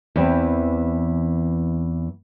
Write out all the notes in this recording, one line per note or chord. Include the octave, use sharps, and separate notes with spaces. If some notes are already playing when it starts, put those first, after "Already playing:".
E2 E3 C4